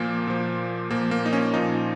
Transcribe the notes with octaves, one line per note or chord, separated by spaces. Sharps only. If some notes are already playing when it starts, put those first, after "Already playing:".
Already playing: A#2 F3 A#3
A#2 F3
A#2 F3 A#3
A#3
D#4
C#4
A#2 F3 D#4